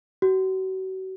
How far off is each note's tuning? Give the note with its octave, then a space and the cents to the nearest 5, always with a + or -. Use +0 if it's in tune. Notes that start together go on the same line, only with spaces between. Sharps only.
F#4 +35